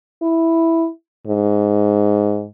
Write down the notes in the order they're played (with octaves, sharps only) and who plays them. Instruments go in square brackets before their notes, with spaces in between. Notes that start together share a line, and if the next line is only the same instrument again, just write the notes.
[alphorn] E4
G#2